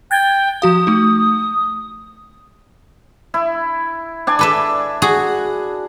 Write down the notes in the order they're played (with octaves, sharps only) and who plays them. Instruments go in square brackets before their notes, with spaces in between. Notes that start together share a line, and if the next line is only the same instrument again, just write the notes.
[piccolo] G5 [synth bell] F#6 G#6 A6
[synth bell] F3 F#4 F5 [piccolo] D#6
[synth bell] A3 D#4
[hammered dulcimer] E4
D4 D5 G#5
[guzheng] A4 B4 E5
F#4 G#4